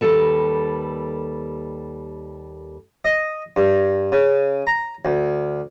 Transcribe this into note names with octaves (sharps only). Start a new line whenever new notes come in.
D#2 C3 G3 A4 B4
D#5
G2
C#3
A#5
D2